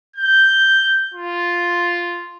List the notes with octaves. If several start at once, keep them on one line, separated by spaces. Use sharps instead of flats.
G6
F4